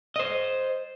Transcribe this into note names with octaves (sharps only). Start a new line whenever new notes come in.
C5 D#5